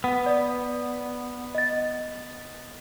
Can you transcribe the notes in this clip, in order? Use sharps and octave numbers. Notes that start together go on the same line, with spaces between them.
B3
D5
D#5 A6